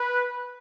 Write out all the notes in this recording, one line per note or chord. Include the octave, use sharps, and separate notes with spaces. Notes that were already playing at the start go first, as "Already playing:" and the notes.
Already playing: B4